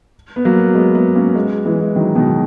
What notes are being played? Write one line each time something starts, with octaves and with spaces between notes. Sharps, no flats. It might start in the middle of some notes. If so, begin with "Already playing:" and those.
B3
F#3 A#3
G#3 B3
G#3 B3
A#3 C#4
G#3 B3
E3 G#3
E3 G#3
D#3 F#3
B2 D#3